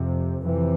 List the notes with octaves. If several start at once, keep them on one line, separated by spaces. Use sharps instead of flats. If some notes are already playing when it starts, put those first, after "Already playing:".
Already playing: F2 C3
F2 C3 E3